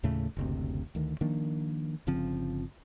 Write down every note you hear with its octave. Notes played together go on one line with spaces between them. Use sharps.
D#2 A2 C#3 A3
F#1 D2 C3
D2 D#3
D#3 F3 A#3 D4
G1 C#3 F3 C4